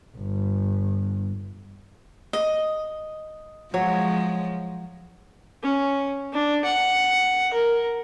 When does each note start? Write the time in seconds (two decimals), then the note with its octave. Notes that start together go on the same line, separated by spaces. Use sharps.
0.16 G1
2.33 D#5
3.74 F3 F#3 G#3 C#5
5.63 C#4
6.33 D4
6.65 F#5
7.53 A#4